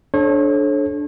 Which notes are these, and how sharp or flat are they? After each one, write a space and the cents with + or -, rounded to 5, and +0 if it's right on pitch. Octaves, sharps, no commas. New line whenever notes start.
D4 +0 A4 -30 C#5 -35